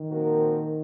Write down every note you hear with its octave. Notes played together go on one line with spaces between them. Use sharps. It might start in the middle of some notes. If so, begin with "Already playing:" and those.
Already playing: D#3
A#2 F3 C4 F#4 A#4